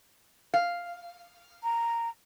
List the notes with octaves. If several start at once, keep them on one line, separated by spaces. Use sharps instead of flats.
F5
A#5